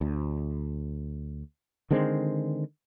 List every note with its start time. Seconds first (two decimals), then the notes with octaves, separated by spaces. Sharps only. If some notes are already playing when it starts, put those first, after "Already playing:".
0.01 D2
1.91 D3 D#3 G#3 C4